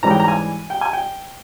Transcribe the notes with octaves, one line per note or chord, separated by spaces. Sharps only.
G#2 E3 G3 C#4 E4 A#5
G5
A#5
G#5
G5
G#5
G5